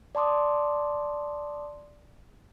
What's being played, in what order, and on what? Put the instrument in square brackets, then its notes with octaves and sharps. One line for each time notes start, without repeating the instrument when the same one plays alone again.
[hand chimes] D5 A5 C6 D6 D#6